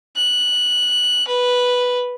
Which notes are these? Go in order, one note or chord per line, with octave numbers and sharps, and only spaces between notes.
F#6
B4